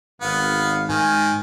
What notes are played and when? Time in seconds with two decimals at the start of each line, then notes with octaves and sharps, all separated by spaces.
0.21 G#1 B3 F5
0.89 G#2 D#3 G#5